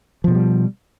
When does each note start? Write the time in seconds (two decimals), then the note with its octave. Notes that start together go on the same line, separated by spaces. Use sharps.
0.24 F3
0.28 B2
0.31 G#3
0.35 G3